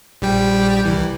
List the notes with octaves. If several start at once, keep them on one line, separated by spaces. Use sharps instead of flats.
A#1 G3 G5
C2 E3